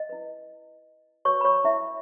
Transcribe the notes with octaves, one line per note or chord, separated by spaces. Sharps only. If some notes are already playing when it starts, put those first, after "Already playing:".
Already playing: D#5
E4 B4
F#4 B4 C#5 C#6
B5
C#5 C#6
E4 E5